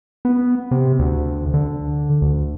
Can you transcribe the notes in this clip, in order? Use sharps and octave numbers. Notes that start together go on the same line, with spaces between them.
B3
C3
D2
D3
D2